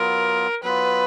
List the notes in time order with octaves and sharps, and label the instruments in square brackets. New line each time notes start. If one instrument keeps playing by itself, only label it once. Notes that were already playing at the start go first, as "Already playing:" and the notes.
Already playing: [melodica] F#3 B3 F4 [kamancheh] A#4
[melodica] F#3 B3 F4 [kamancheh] B4